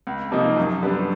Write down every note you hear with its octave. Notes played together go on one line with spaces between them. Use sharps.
C#2
C3 F3 A#3 D#4
F#2
D3 G3 B3